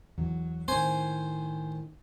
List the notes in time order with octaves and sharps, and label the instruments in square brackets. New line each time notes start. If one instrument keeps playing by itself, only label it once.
[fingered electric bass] E2 E3 [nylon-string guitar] F#3
[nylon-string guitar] A2 D#3 [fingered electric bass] C4 [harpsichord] C5 G#5